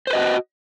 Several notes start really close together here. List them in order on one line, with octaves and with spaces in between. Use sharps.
C5 B4 D#5 F#4